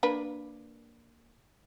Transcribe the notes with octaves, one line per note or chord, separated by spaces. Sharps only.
A#3 D4 B4